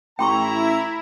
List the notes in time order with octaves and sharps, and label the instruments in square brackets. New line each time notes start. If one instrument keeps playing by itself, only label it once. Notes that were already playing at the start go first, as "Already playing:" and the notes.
[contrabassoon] A1 [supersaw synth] E4 [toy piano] G5 C6 C#6 [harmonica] A#5